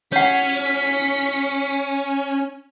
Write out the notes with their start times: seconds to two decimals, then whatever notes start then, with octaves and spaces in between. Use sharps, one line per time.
0.12 C#4 C#5 F#5 B6